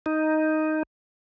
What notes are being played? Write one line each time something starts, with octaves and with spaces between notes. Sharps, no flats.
D#4